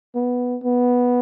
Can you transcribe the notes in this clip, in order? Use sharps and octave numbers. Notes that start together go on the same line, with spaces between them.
B3
B3